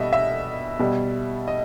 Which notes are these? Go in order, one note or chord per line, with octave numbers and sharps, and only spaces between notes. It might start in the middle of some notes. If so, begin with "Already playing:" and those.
Already playing: B2 G3 D#5 E5
E5
B2 G3
D#5